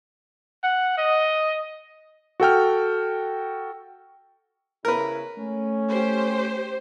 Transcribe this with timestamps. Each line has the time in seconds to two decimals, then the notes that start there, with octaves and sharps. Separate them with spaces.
0.64 F#5
0.98 D#5
2.40 F#4 A4 G5 F6
4.85 C#3 E4 A#4 B4
5.37 A3 C#4
5.88 G4 C5